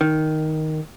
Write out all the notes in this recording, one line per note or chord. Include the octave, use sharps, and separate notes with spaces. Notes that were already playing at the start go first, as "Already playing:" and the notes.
D#3